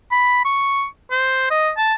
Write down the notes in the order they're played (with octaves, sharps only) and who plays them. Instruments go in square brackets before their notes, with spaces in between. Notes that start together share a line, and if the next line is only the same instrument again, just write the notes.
[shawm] B5
C#6
C5
D#5
A5